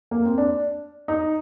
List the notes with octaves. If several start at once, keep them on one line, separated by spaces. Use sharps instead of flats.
A#3
C4
D4
D#4